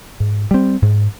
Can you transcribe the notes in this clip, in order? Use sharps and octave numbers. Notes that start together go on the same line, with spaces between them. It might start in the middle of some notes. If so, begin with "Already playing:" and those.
G#2
G3 C4
G#2